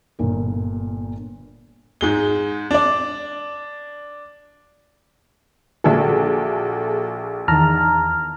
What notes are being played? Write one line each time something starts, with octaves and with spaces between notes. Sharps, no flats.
G1 A#2 A#4
G#2 G#3 G7
D4 D5
A#1 F#4 G#4 A4 E5
E2 D#3 A5 A#5 F6